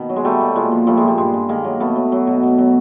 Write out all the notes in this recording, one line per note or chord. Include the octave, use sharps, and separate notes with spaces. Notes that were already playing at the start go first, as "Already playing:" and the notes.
Already playing: B2 D#3
F#3
G#3
F#3 G3 A3
B2
A#2 G#3
F3
F3 G3 A3
G#3
A#2
G3
G2 G#3
G2
D#3 G#3 A#3
F#3
B2 A3 B3
F#3
F#3
B2
B2
F#3